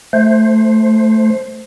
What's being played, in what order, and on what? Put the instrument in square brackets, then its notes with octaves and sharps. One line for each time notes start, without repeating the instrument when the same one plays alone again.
[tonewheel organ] A3 C5